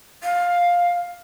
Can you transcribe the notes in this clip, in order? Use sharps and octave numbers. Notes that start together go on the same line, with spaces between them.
F5